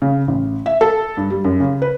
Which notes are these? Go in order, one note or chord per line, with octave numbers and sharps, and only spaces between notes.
C#3
A1
E5
A4
G2
G3
F#2
C#3
B4